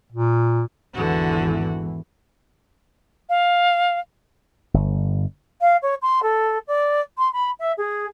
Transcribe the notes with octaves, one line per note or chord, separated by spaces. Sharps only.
A#2
G#1 E2 D3 E3 F#4
F5
G1
F5
C#5
C6
A4
D5
C6
B5
E5
G#4